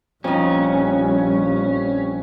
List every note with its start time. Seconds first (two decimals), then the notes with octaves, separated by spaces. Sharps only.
0.24 A#1 F2 G3 C#4 D#4